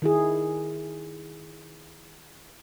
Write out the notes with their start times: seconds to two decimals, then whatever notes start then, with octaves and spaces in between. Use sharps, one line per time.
0.02 D#3 E4 G#4